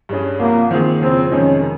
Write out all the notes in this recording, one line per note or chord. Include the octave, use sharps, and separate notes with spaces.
G2 G3 C#4 G#4
C2 C3 F3 A#3
D#3 A#3 C4 F4 G#4
F2 C#3 F3 C4
F2 C3 D#3 G#3 C#4 D#4
A#4